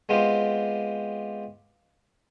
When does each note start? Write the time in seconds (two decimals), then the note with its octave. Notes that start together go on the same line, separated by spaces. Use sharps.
0.09 G#3 B3 C4 F4 G4 C5